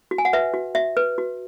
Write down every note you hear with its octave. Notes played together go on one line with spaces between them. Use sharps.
F#4
G#5
F#5
B4 E5
F#4
F#4 E5
B4
F#4